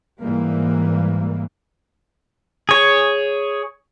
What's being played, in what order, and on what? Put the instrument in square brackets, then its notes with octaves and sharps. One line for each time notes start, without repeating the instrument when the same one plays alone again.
[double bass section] G#2 E3 G3 A#3
[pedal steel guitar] G#4 C#5